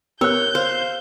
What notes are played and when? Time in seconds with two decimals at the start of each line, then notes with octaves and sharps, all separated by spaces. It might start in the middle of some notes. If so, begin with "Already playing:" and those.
0.21 B3 G4 A#4 C#5 E6 F#6 G6
0.55 C5 F5